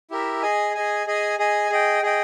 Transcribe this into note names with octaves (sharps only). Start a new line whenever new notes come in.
E4 G4 A#4 E5
G#4 D#5 G#5
G#4 D#5 G#5
G#4 D#5 G#5
G#4 D#5 G#5
G#4 D#5 G5
G#4 D#5 G5